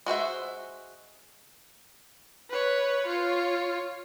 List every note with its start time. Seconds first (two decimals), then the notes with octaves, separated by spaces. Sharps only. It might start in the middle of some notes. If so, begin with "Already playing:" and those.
0.06 G#3 F#4 C5 E5
2.50 B4 C#5
3.06 F4 C#5